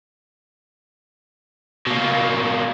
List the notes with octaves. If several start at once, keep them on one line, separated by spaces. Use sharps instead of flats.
B2 A#3